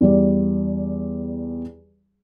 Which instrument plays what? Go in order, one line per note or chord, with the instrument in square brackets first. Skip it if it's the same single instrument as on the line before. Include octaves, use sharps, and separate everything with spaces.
[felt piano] E2 G3 D5